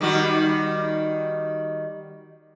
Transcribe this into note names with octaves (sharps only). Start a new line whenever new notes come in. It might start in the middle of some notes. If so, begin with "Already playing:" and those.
D#3 G3 F#4